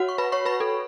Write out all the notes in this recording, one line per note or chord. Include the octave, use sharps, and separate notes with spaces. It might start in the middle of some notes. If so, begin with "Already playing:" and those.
Already playing: F#4 C#5 F#5
C#6
B4 B5
C#5 C#6
B4 B5
A4